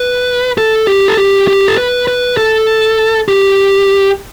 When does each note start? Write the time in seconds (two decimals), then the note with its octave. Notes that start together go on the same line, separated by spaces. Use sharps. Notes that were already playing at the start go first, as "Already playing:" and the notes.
Already playing: B4
0.58 A4
0.87 G4
1.08 A4
1.17 G4
1.48 G4
1.68 A4
1.78 B4
2.08 B4
2.37 A4
3.28 G4